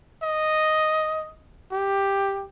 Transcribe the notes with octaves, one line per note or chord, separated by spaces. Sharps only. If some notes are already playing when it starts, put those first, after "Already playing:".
D#5
G4